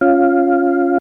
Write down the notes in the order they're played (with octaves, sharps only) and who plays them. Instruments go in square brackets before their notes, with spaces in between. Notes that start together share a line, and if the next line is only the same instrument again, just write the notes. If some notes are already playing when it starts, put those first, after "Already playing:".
[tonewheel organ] C#4 F4 F5